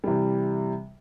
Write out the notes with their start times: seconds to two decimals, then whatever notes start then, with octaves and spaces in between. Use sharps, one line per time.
0.04 C3 E3 G3